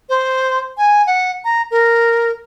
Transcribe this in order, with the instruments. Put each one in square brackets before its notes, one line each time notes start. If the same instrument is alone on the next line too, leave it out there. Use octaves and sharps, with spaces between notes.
[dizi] C5
G#5
F#5
A#5
A#4